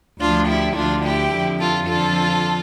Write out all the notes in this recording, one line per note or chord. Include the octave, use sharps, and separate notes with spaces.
D2 D3 F3 D4 F4
E4 G4
D2 D3 F3 D4 F4
E4 G4
F2 D3 F3
F4 A4
F2 D3 F3 F4 A4